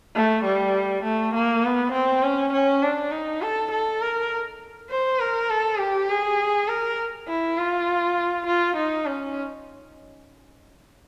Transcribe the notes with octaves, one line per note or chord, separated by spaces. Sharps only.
A3
G3
A3
A#3
B3
C4
C#4
C#4
D4
D#4
A4
A4
A#4
C5
A#4
A4
G4
G#4
A#4
E4
F4
F4
D#4
C#4